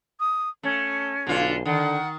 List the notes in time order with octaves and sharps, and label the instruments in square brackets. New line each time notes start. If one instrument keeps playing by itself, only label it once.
[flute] D#6
[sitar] A3 [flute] C#4
[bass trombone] B1 [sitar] D3 F4
[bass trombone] D3 [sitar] D#3 [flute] F#5